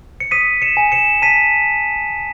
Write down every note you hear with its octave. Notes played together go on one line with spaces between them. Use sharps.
C#7
D#6 B6 D#7
C#7 E7
G#5
C#7 E7
A5 B6 D#7